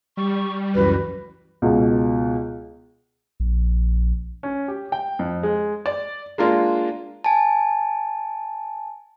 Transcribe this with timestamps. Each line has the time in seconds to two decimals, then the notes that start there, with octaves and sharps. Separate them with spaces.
0.17 G3 C#6
0.75 C#2 F#2 E3 F#4 B4
1.62 C#2 B2
3.40 A#1
4.43 C#4
4.68 G4
4.92 G5
5.19 F2
5.43 G#3
5.86 D5
6.38 G#3 A#3 D4 F4
7.24 G#5 A5